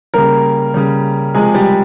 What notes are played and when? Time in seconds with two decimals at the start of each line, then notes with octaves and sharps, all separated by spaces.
0.14 C#3 G3 A#3 A#4
0.74 C#3 G3
1.34 C3 F3 G#3 G#4
1.55 G3 G4